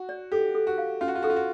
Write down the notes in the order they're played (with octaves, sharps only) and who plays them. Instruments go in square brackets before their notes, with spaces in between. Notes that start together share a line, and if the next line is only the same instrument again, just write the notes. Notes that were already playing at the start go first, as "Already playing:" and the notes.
Already playing: [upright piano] F#4
[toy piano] D5
[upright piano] G4 [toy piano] A4
[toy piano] A4
[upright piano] F#4
[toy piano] F5
[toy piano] C#4 [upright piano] F4
[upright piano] F#4
F4
[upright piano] F#4 [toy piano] A4
[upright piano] F4
F#4